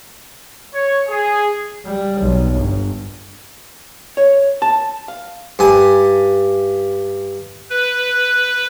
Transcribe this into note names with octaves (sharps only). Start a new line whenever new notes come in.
C#5
G#4
G3
B1
G1
C#5
A5
F5
G2 G#5
B4